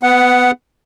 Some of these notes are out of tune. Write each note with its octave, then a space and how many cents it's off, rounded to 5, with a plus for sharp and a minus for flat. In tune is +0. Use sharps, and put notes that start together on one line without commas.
B3 +20 F#5 +0